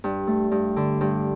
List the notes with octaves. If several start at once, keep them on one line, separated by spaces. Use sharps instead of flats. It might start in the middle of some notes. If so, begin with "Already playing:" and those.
G2
A3
G2
D3
G2